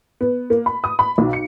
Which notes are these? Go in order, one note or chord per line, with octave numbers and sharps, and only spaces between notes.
B3
A#3
B5
D#6
B5
B1
C#7